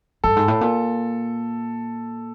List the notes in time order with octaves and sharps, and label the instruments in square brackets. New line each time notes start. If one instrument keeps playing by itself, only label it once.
[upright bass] G2 [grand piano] A4
[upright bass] G#2
A2
A#2